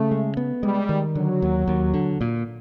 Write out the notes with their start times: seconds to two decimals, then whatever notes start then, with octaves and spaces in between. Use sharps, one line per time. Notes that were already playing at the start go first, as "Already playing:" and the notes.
Already playing: C#3 A3
0.11 G#3
0.37 B3
0.63 G3 G#3
0.89 D#3
1.15 D3 F#3
1.42 D#2
1.68 D#2
1.94 D3
2.21 A#2